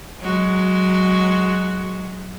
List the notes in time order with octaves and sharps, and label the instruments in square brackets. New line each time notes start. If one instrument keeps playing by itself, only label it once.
[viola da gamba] F#3 G#3 F#4